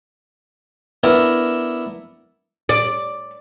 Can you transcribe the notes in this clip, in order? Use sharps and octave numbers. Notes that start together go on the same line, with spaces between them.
B3 D4 E4 A#4 D5 A5
D5